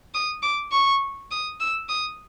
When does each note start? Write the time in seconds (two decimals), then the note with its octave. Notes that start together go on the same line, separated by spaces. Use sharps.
0.14 D#6
0.42 D6
0.72 C#6
1.31 D#6
1.60 E6
1.89 D#6